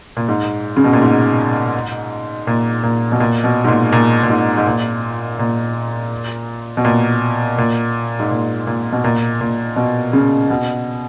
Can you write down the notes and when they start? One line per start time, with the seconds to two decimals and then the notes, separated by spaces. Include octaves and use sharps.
0.17 A#2
0.28 G#2
0.77 C#3
0.84 B2
0.93 A#2
1.01 G#2
2.47 A#2
2.83 A#2
3.12 B2
3.20 A#2
3.44 B2
3.64 G#2
3.68 A#2
3.92 A#2
4.23 A#2
4.30 G#2
4.58 G#2
4.67 A#2
5.39 A#2
6.77 B2
6.85 A#2
7.58 A#2
8.19 G#2
8.31 A#2
8.67 A#2
8.92 B2
9.04 A#2
9.41 A#2
9.76 B2
10.13 C#3
10.50 B2